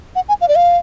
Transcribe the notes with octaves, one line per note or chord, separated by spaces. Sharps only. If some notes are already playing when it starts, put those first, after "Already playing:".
F#5
G#5
F5
D5
F5